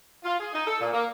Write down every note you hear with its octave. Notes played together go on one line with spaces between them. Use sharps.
F4
G#4
D#4
A4
A#2
A#3